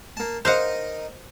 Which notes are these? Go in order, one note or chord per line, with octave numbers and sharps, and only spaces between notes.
A#3 A5
D#4 A#4 C5 D#5 F5 F#5